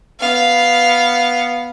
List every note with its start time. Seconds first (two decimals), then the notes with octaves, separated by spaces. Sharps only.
0.20 B3 F5